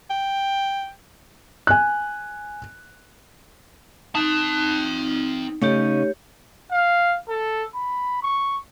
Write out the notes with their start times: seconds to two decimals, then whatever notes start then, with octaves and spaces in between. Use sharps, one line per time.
0.10 G5
1.67 G#5 F#6
4.15 C4 D#4 A5
5.62 C#3 A3 C#4 D#4 G4 C#5
6.71 F5
7.29 A4
7.75 B5
8.23 C#6